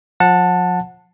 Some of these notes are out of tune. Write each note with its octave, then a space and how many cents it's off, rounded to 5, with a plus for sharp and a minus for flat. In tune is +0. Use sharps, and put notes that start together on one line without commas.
F3 +35 F#5 -15 A5 +10